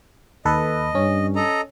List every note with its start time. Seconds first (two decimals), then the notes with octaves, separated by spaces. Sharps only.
0.45 D#2 A4 B4 D#5
0.95 G2 C#4
1.36 A4 D#5 A#5